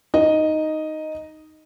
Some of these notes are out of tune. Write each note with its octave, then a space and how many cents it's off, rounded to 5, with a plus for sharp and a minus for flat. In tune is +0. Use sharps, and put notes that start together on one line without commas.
D#4 +0 D#5 +0